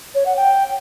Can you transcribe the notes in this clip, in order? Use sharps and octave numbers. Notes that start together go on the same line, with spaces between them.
C#5
F#5
G5